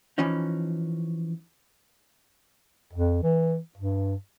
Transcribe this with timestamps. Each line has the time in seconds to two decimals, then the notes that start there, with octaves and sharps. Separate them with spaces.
0.18 E3 F3 C#4 D#4
2.93 F2
3.23 E3
3.78 G2